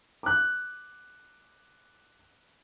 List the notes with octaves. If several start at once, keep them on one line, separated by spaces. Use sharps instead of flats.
D6 F#6